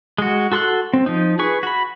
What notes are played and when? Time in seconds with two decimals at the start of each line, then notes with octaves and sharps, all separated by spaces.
0.18 G#3 F#4
0.52 F#4 A4 C6 C#6 F#6
0.94 C4
1.06 F3 D#4
1.39 G#4 B4 C#6
1.63 F#4 B5